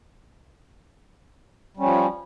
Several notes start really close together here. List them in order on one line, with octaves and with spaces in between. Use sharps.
G3 C#4 F3